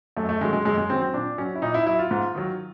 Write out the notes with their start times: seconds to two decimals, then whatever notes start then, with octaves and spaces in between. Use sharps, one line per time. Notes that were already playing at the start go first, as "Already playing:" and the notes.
0.17 F#2 A3
0.29 A3
0.41 D#3 G#3
0.44 F#3
0.53 G#3
0.65 F#2 G#3
0.78 G#3
0.90 D#3 F#3 C4
1.02 C4
1.13 A#2 D4
1.38 F#3 C#4
1.55 E4
1.62 A#2 D#4
1.74 E4
1.86 F#3 E4
1.99 F4
2.11 G#2
2.35 D#3 F#3